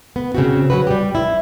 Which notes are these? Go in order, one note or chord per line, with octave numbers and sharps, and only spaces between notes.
B3
C#3 C4 F#4
F#3 F#4 B4
G3 G4
E4